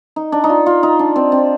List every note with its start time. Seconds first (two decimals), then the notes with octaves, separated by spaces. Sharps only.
0.16 D#4
0.32 D4
0.44 D#4
0.49 F4
0.66 F4
0.83 D#4
0.99 D4
1.16 C4
1.32 C4